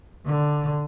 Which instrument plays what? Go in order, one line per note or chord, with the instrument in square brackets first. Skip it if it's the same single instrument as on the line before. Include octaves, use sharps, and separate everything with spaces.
[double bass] D3